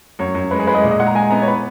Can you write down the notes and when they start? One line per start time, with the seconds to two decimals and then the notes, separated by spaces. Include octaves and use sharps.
0.19 F#2 C#5
0.35 F#2
0.51 G#3 B4
0.59 G#4
0.67 G#3 B4
0.74 D#5
0.84 A#2
0.91 D#5
1.00 G#3 F#5
1.07 A#5
1.15 G#3 G#5
1.31 B3 A#5
1.42 C#5
1.48 B4